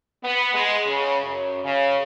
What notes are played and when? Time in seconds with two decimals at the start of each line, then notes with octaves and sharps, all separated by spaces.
0.24 B3
0.54 G#3
0.86 C#3
1.23 F#2
1.64 C#3